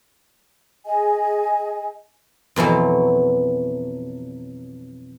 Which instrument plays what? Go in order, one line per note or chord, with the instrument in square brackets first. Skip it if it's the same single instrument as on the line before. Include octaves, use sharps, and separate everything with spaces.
[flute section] G#4 D#5 G#5
[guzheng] F2 B2 E3 F#3